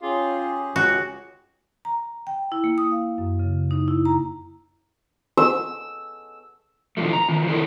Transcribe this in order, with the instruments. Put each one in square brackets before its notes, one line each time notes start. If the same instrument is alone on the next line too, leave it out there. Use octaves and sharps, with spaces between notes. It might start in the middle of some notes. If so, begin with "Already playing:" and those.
[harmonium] C#4 G4 G#4 [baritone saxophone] F4
[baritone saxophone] C#2 [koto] F#4
[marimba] A#5
G5
E4
A#3
D#6
F5
F#2
C#3
D#4
E4
A#5
[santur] E6
[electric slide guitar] B2 D3 E3 F3 A3
A#5
D#3 F3
D#3 E4 F#4 A4 A#4